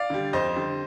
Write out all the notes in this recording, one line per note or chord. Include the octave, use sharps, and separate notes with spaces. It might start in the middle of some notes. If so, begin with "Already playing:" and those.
Already playing: D5 F5
D3 G3
F2 C5 D#5
D3 G3